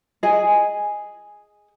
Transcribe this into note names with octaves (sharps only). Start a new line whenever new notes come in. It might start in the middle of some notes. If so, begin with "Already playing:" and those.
G#4 D#5 G#5